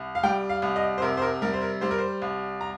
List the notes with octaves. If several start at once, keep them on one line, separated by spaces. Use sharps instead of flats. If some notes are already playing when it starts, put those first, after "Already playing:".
Already playing: C2
F5
G3 G5
F5
C2
D#5
C5
C3 A#4
C5
A#4
G3 A#4
C5
A#4
G3 C5
A#4
C5
C2
A#5